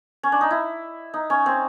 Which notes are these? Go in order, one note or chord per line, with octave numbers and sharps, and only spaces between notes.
C#4
D4
D#4
E4
D#4
C#4
C4